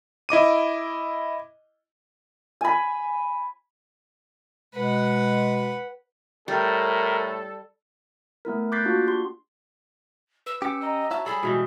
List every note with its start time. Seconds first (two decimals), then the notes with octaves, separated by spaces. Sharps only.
0.29 E4 D#5 D6 D#7
2.61 G#5 B5
4.74 B2 G#3 B4 F#5
6.48 A2 G3 A4 A#4
8.45 A3 B3 E4 A#4
8.72 D6 F#6 G6 A6 B6 C7
8.85 A#3 D4 F4 F#4
9.07 G4 C6
10.46 B4 E6
10.62 C#4 G4 D6 E6 C#7
10.81 D#5 A#5 E6
11.11 E4 F#4 C#5 E5 A5
11.26 G3 G#4 A4 B5
11.43 B2 E3 G3 G#3 D#6